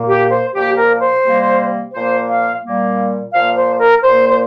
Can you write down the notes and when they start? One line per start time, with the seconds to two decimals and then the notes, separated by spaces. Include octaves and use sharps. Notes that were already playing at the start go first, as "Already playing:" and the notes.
Already playing: A#2 A#3
0.09 G4
0.31 C5
0.55 A#2 F3 A#3 G4
0.78 A#4
1.01 C5
1.24 C3 G3 A#3
1.94 A#2 F3 A#3 C5
2.30 F5
2.64 A#2 G3 A#3
3.34 A#2 F3 A#3 F5
3.57 C5
3.80 A#4
4.04 A#2 A#3 C5
4.30 C5